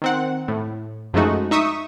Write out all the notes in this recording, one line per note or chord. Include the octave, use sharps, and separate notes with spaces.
D#3 C4 F#5
A2
F#2 F3 G#3 A3 D#4 F#4
D#4 E5 C#6 D#6